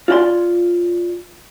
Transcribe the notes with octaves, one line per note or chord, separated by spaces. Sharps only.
F4 C#5 D5 F#5 C6